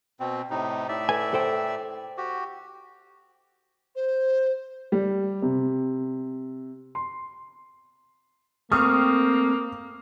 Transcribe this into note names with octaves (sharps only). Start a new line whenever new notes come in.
B2 C4
A2 C3 D#4
A2 D5 E5
A4 B4 G#5
A4 C5 G5
F#4 G4
C5
G3
C3
C6
A3 A#3 C4 C#6 D#6 F6